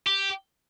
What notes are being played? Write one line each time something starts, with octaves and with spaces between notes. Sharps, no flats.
G4